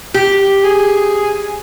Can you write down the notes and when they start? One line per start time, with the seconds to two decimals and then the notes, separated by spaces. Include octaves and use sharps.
0.14 G4
0.64 G#4